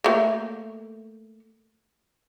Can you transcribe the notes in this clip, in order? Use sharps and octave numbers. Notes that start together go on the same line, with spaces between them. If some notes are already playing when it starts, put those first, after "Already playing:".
A3 A#3